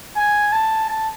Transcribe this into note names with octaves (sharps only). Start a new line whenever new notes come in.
G#5
A5
A5